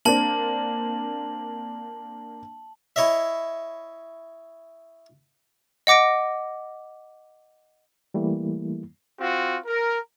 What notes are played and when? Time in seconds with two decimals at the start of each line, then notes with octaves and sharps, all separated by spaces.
0.05 A#3 C4 D4 A5 F#7
2.96 E4 C#5 D#5 E5
5.87 D#5 F#5 D6 A#6 D7
8.14 E3 G3 A3 A#3 E4
9.20 C4 F4 F#4
9.66 A#4